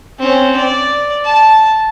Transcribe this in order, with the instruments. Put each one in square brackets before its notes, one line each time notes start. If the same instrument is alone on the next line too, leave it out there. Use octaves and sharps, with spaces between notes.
[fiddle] C4 C#4
D5
A5